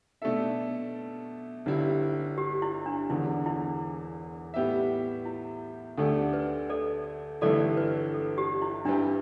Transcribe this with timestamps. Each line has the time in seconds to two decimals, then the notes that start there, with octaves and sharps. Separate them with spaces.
0.22 B2 A3 D4 A4 E5
1.66 G1 G2 G3 E4
2.38 G4
2.62 E4
2.86 D4
3.09 E1 E2 D3 E4
3.46 E4
4.54 A2 G3 B3 G4 E5
5.25 E4
5.98 D2 D3 A3 D4 G4 A4
6.33 B4
6.70 A4 D5
7.41 G1 G2 E3 A3 E4 A4 D5
7.77 B4
8.14 A4
8.38 G4
8.62 E4
8.85 G2 G3 D4 E4 G4 B4